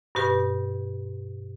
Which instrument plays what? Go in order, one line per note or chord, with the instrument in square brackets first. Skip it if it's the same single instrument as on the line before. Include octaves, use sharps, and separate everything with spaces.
[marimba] G2 B2 G4 B4